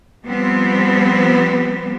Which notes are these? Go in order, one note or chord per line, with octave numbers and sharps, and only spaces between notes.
F3 G3 B3 C4